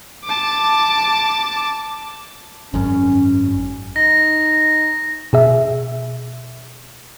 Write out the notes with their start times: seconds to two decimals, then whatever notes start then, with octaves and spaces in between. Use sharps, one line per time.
0.25 A5 D6
2.74 G#1 F#2 C#4
3.96 D#4 A#6
5.33 B2 G#4 E5